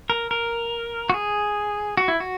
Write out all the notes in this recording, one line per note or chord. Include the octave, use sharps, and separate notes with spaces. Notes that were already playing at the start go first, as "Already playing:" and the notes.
A#4
A#4
F#4
G#4
F#4
E4
F#4